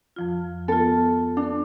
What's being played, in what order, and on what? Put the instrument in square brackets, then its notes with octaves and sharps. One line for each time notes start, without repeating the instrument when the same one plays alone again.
[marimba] F2 F3 F4
[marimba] B3 F4 [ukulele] A4
[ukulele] D4